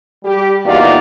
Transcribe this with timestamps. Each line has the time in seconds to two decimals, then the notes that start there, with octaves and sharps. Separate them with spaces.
0.25 G3 G4
0.65 E2 A#3 D#4 F4 F#4 D5